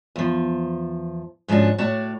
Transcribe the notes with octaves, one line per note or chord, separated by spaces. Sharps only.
E2 F3
G#2 F3 C#4 D4 F#4
A2 F#4 C#5 D5 A5